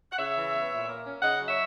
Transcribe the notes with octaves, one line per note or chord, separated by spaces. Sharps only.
F#5
C#3 C#5 E5
E3
B3
A#2
A#3
C#4
C#3 D#5 F#5
F#3
C#5 E5